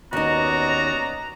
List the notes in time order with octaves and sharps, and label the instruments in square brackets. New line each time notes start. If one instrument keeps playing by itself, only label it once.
[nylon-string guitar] D#2 D#4 [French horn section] B3 C#4 [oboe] F#4 [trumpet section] D5 D#5 A#5